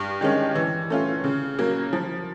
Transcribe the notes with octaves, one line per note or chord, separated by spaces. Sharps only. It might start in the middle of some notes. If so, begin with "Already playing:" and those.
Already playing: G2
D#3 G#3 C#4
E3
A3 C#4 F4
C#3
F#3 A#3
F3